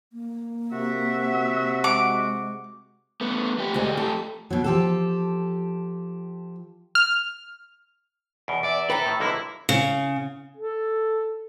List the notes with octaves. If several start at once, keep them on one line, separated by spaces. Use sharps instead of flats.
A#3
C3 F#4 E5
G#3 D6
A3 B3
A3 G4
D2 G#3
A4
B2 F#3
F3 G4 A4
F6
E2 B2 D7
E2 D5 E5
A4 B4 G5 A#5
A2 D#3
B1 D3 A#3 E4
C#3
A4